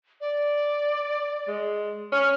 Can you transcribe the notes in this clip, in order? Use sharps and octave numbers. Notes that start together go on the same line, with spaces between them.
D5
G#3
C#4 F6